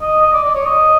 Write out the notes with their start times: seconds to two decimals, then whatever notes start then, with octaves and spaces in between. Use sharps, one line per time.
0.01 D#5
0.22 D#5
0.33 D5
0.44 D5
0.55 C#5
0.66 D#5